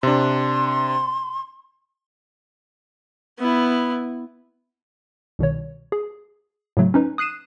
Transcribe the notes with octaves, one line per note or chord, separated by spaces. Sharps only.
C3 D4 C6
B3 E4
C2 B2 D#3 C#5
G#4
A2 C#3 F#3 A3
C#4 D#4 B4
D#6 F#6 C7 D#7 E7